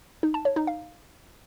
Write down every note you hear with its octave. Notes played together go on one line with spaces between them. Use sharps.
D#4
A5
C#5
D#4
F5